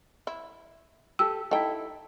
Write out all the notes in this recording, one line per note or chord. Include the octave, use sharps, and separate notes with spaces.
E4
G4 A4 E6
D#4 E4 A4 G5